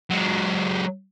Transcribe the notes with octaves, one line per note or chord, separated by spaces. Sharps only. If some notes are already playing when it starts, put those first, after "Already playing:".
F#3 G#3